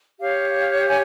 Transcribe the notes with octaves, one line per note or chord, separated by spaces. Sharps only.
G4 C#5 F5
F5
G#5